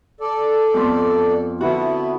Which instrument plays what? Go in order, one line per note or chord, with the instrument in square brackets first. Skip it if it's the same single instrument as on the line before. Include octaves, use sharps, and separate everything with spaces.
[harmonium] A4 D5
[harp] F2 B3 C6
[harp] D3 F#4 [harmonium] B3 E4